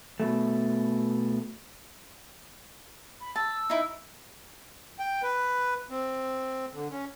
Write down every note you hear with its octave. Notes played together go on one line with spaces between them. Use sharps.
B2 A3
B5
A5 E6
D#4 E4
G5
B4
C4
D3
C#4